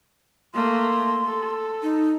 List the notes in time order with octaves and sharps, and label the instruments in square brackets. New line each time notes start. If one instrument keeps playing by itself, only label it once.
[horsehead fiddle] A3 A#3 [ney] C6
[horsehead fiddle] A4
[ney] D#4